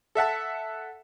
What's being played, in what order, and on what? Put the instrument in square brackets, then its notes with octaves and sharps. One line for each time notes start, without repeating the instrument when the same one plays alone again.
[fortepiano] A4 E5 F#5 A5